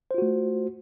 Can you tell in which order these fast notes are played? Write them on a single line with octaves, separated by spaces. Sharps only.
C5 F4 F#4 A3